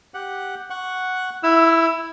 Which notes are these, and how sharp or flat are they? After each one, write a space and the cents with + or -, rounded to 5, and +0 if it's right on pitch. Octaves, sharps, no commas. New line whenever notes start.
G4 +0 F#5 +0
F#5 +0 C#6 +0
E4 +0 E6 +25